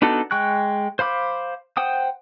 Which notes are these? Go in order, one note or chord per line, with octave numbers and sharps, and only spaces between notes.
B3 D4 D#4 F#4 A4
G#3 G5 C#6 F#6
C5 F5 B5 D6
C5 F#5 G5 D#6